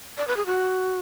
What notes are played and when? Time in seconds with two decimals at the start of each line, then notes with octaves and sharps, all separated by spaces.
0.18 D5
0.28 B4
0.37 G#4
0.46 F#4